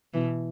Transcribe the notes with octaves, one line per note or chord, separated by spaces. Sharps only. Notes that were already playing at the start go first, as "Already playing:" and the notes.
B2 E3